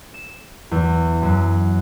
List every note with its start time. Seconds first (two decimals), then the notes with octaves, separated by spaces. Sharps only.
0.14 E7
0.71 E2
1.22 F#2